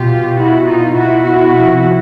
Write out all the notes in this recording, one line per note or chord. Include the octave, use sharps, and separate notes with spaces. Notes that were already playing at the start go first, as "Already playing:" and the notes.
Already playing: B2 F4 G4
B2 E4 F#4
D#4 F4
B2 E4 F#4
E4 F#4
C3 F3